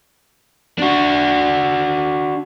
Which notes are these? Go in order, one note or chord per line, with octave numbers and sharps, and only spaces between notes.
D4 F#4